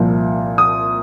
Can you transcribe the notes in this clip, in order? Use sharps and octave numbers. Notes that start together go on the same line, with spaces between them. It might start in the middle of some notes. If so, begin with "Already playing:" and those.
Already playing: C2 A#2 F3
D#6